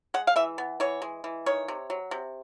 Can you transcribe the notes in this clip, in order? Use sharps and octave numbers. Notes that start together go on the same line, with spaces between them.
G#3 F#5
F5
E3 E5
B3
E3 C#5
G#3
E3
D#3 C#5
C3
F#3
C3